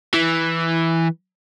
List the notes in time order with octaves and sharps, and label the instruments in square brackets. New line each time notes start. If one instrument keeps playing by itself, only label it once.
[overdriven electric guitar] E3